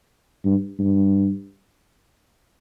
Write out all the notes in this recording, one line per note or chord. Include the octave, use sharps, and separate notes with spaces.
G2
G2